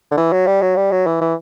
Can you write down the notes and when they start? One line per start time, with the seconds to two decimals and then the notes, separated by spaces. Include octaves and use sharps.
0.11 D3
0.17 E3
0.32 F#3
0.47 G3
0.62 F#3
0.76 G3
0.92 F#3
1.06 E3
1.21 E3